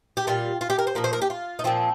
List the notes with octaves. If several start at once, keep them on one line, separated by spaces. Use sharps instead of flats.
G4
A#2 G3 F4
F4
G4
A#4
C5
A#2 F3 A#4
C5
A#4
G4
F4
D#4
A#2 F3 C4